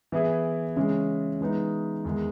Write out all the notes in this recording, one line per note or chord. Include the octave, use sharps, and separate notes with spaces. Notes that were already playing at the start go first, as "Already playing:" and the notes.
E3 B3 E4 G#4
C#3 E3 G#3 C#4
E3 G#3 B3 D#4
E2 D#3 G#3